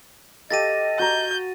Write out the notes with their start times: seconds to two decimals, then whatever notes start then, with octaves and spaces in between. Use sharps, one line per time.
0.50 G4 A4 D#5 F5 A6 A#6 D#7
0.99 F#4 A#5 G6